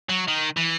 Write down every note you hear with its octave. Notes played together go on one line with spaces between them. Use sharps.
F#3
D#3
E3